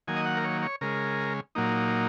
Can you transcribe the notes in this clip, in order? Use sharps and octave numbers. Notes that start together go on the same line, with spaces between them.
D#3 F#3 A#3 G#5
D#5
F#5
A#4
C#5
C#5
C#3 G#3 A#4
A#2 F#3 A#3 D#4